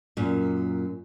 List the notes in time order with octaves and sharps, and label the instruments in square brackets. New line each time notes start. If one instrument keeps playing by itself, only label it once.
[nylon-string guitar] F#2 A#2